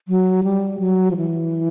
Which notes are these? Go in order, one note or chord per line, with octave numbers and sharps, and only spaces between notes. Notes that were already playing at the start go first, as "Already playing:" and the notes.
F#3
G3
F#3
F3
E3